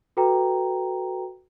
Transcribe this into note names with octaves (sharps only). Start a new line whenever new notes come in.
F#4 A4 B4 G5 A#5